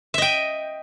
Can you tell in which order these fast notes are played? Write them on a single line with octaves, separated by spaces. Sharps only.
E5 D#5 G5